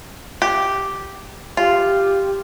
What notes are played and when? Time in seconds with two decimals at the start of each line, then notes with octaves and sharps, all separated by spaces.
0.42 G4
1.57 F4 G4